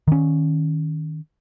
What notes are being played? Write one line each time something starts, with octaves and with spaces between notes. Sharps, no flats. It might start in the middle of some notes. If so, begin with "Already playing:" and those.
D#3 C#4